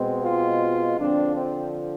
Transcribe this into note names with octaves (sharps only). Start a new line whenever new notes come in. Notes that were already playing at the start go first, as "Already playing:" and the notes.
Already playing: B2 G#3 C4
F4
D3 F3 C4 D4
C4